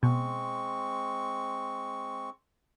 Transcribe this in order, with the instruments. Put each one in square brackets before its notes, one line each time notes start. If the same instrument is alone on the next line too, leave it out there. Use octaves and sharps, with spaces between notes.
[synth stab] B2 [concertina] G#3 C4 C#6